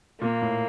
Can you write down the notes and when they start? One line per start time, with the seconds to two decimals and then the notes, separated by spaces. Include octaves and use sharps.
0.21 A#2 A#3
0.42 A2